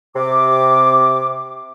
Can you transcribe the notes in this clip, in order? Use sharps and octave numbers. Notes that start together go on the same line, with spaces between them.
C3 D6